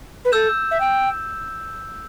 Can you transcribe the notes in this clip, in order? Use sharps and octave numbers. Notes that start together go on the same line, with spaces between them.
B4
A4 E6 G6 E7
E5
G5